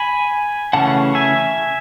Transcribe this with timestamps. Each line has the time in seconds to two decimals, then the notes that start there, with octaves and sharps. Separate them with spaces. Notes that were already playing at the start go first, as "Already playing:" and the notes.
Already playing: G#5 B5
0.73 C#3 E3 A3 C#4 F#5 A5
1.15 E5 G#5